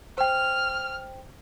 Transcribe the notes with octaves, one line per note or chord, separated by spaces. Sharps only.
C5 G5 F6